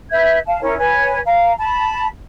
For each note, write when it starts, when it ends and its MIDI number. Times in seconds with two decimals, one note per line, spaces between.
0.11 0.37 71
0.11 0.37 76
0.11 0.37 91
0.11 0.37 92
0.46 0.59 77
0.46 0.59 81
0.61 0.76 61
0.61 0.76 64
0.61 0.76 70
0.61 0.76 73
0.77 1.19 71
0.77 1.19 73
0.77 1.19 80
1.25 1.52 77
1.25 1.52 82
1.58 2.06 81
1.58 2.06 83